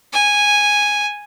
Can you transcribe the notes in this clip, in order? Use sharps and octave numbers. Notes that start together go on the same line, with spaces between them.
G#5